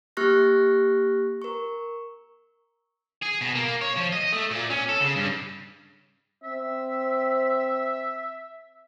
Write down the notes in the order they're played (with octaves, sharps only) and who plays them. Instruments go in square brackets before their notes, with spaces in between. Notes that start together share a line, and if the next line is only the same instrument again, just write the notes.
[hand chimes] A#3 G4 C#6 F6 F#6 A#6
A#4 C#6
[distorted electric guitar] G#4
B2
A#3
C#5
F3
D#5
A3
A#2
C#4
A4
C#3
G2
[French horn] C4 [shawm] E5